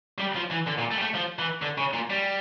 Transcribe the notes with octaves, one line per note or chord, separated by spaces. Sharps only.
G3
F3
E3
D3
A#2
A3
G3
A3
F3
E3
D3
C#3
A#2
G3